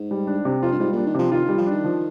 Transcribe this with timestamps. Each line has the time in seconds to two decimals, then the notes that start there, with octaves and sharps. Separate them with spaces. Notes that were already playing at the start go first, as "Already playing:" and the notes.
Already playing: G#2
0.11 G3
0.27 D4
0.45 C3
0.62 F2 F4
0.71 G2
0.79 G#2 G3
0.93 A#2 D4
1.06 D#3
1.14 C3 F3
1.32 D#3 F4
1.45 D#3 G3
1.58 F3
1.66 D#3 D4
1.84 F3